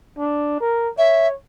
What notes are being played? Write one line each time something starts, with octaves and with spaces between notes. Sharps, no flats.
D4
A#4
C#5 E5